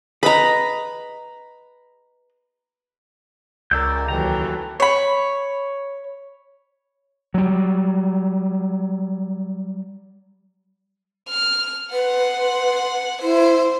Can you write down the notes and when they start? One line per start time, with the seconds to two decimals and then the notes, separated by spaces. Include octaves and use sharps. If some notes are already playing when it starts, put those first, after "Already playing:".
0.23 G#4 B4 D#5 A#5 B5
3.71 C#2 C#3 A#4 D5 E6 G6
4.08 D#2 E3 F#3 G4 A4 A#5
4.80 C#5 B5
7.34 F#3 G3
11.29 F6
11.93 B4 F#5 C6
13.22 E4 C5